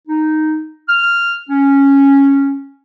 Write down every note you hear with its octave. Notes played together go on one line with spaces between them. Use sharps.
D#4
F6
C#4